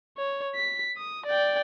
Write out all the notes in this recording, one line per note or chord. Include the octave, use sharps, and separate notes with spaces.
C#5
B6
D#6
D5 G5